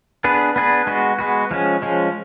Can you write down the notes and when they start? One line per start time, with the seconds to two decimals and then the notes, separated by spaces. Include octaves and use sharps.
0.24 B3 D4 G#4 B4
0.56 B3 D4 G#4 B4
0.87 G#3 B3 F#4
1.19 G#3 B3 F#4
1.51 F3 G#3 C#4
1.82 F3 G#3 C#4